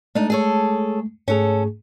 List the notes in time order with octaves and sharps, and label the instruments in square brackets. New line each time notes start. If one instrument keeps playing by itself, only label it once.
[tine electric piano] G#3 A3 [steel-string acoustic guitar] D4 D#4
[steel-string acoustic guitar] G#4 A4 C#5
[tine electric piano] G#2 A3 G#4 [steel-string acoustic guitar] C#4 A4